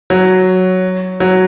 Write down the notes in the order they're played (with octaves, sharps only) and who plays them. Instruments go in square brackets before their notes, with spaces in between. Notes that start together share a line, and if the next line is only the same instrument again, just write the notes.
[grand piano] F#3
F#3